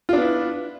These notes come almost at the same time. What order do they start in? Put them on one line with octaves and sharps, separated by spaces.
F4 D4 B3 E4